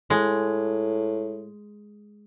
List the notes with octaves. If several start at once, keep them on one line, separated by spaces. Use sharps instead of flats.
A2 G#3